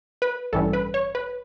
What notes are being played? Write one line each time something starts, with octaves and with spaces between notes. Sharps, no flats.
B4
A1 G2 E3 G3 C#4 A4
B4
C#5
B4